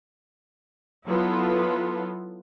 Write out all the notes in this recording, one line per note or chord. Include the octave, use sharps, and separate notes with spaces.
F#3 B3 E4 F4 A4 B4